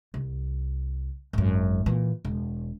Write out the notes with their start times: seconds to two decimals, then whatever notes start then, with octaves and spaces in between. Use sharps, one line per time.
0.14 C2
1.33 G#1 F#2
1.86 A#2 E3
2.25 E1